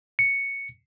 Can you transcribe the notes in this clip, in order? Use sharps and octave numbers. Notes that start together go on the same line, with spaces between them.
C#7